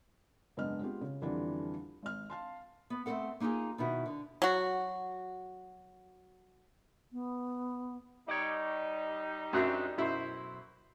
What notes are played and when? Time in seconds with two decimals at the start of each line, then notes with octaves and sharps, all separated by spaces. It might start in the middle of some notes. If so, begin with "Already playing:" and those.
0.57 F#1 G#2 B3 D4 D#5 F6
0.80 G#3 B3 C4 F4 G4
1.01 C#3
1.21 F2 D3 E3 G3 D4 F4
2.03 G#1 F6
2.30 F5 A5 C6
2.90 B3
3.06 A3 A#3 C4 A4 F#5
3.40 A#3 D#4 F4 G4 G#4
3.78 B2 D#3 D#4 E4 F#4
4.06 D3
4.42 F#3 F#4
7.13 B3
8.28 G3 D#4 C#5 D5
9.53 F#2 F#3 C4 D4 E5
9.98 B1 F#2 E4 C5